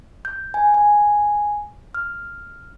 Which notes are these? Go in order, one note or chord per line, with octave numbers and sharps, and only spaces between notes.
G6
G#5
G#5
F6